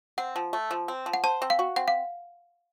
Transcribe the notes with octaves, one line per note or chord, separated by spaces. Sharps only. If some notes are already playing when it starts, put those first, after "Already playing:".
C4 F#5
F3
A3
F3
C4
F3
F#5
C5 A5
C4
F5
F#4
C4 F#5
F5